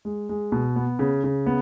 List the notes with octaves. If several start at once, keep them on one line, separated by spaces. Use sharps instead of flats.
G#3
G#3
B2
B3
C#3
C#3
B3